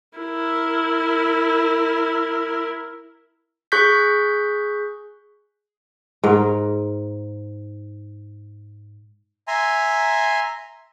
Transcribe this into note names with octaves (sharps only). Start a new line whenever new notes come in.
E4 A#4
G#4 C#6 F#6 G6 B6
G#2 A#4
E5 G#5 A#5 C6